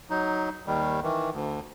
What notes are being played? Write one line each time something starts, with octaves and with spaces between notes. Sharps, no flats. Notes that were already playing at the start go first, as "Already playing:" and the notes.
F#3 D#4
D#2 D#3 G3
D#3 E3
D2